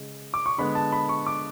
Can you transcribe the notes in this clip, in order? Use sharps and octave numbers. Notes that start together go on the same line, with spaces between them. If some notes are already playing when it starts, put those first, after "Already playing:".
Already playing: C#3 G#3
D6
C#6
D3 G#3 B3 B5
A5
B5
C#6
D6